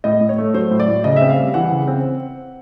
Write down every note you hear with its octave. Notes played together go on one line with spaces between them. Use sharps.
A2 D#5
A2
C#5
A3
F#3 C5
A2
D5
A2
C#3 D#5
C4 E5
F5
G3
E3 F#5
C#3
C4